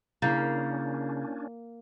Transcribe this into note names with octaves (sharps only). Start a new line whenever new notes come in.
C#3 A#3 C#4 D4 E4 G6 A6